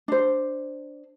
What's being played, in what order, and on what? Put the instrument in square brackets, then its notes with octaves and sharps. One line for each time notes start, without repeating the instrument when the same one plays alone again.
[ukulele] D4 C5